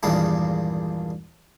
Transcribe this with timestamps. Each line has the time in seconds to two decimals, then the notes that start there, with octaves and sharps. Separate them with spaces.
0.03 E2 G2 A#2 D#3 G#3 D4